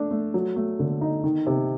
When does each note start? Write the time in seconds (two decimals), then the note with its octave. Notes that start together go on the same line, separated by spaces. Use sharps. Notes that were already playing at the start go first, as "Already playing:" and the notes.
Already playing: A3 D4
0.11 A3
0.34 F#3
0.56 A3
0.79 D3
1.01 D#4
1.24 D#3
1.47 C3